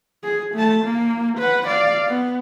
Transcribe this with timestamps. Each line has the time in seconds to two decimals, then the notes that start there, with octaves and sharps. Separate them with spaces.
0.24 G#4
0.54 A3 A5
0.85 A#3
1.38 B4 F#5
1.67 D5 F5
2.08 B3